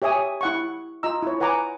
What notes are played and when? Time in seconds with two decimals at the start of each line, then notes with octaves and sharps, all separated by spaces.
0.02 G4 C#5 E5 G#5 D#6
0.41 E4 F#5 C#6
1.03 F4 D#5 A#5 E6
1.22 E4 C#5
1.40 B4 F#5 G#5 A#5 D6